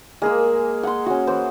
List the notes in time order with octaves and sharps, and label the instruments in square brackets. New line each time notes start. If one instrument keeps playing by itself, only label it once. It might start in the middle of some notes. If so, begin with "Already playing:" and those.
[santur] G#3 E6 [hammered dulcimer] A#3 G#4
[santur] F#5 C6
C#4 F#4
[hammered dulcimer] E3 [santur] C5